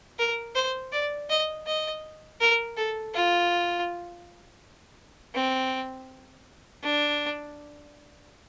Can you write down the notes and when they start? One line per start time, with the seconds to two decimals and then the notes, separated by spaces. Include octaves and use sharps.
0.19 A#4
0.55 C5
0.92 D5
1.30 D#5
1.67 D#5
2.41 A#4
2.77 A4
3.14 F4
5.35 C4
6.83 D4